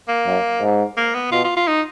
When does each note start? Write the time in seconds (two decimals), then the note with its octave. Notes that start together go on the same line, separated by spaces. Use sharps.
0.08 A#3
0.26 F#2
0.62 G#2
0.97 A#3
1.14 B3
1.32 B2 F4
1.44 F4
1.56 F4
1.68 D#4